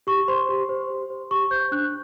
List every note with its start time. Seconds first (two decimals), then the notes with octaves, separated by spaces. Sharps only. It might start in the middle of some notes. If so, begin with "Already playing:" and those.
0.07 G4 C#6
0.28 C5 C6
0.49 G4
0.69 C5
0.90 G4
1.10 C5
1.31 G4 C#6
1.51 C5 G6
1.72 D4 F#6